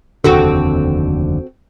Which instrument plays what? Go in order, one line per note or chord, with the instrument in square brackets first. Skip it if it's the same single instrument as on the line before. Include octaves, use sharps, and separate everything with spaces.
[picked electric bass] F1 D#2 D3 [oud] C4 F#4 A4